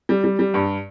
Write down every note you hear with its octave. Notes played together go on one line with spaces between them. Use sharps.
G3
G3
G3
G2